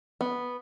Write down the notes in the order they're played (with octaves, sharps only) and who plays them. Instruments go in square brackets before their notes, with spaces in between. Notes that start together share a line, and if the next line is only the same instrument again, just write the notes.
[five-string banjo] B3